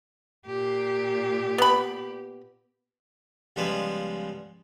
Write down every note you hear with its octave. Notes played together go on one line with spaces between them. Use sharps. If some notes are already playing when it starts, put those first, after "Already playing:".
A#2 G4
B3 B5
C#2 F3 G3 G#3 B3 B4